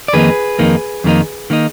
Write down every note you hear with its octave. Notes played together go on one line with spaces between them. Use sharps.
D5
F2 D#3 A#3 D#4 G#4 B4
F2 D#3 A#3 D#4
F2 D#3 A#3 D#4
D#3 A#3 D#4